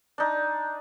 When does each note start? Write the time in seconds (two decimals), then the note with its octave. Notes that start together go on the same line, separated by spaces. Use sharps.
0.18 D4 D#4